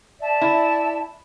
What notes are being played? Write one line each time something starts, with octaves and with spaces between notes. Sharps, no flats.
D5 E5 A5
E4